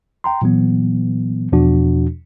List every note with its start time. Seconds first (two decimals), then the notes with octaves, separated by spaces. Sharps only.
0.24 G5 A#5 C6
0.42 A#2 E3 F#3 B3
1.52 E2 B2 F3 D4 F#4